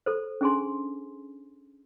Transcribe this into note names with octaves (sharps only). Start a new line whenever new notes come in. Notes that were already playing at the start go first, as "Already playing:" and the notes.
A4 C5
C#4 D4 G#4 G#5 C6